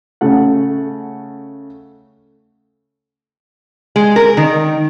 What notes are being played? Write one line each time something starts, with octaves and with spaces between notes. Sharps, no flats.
C#3 A3 F#5
G#3
A#4
D#3